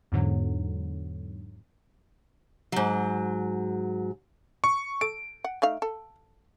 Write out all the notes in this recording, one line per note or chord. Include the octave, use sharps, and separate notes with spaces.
E2 G#2 D3 F#3
G#2 F#3
C#6
A4 D7
F#5
A3 D#4 F5
A4